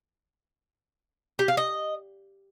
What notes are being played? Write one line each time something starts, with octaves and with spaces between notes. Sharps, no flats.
G4
F5
D#5